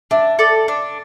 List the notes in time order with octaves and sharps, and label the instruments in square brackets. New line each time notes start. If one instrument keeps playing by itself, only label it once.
[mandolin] D4 [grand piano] E5
[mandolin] A4 D5
D4